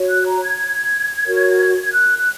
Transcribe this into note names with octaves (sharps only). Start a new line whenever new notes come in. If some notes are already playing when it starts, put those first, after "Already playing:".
Already playing: F#4 C#5
F#6
A#5
G#6
F#4 A#4 C#5
G#6
F#6
F#6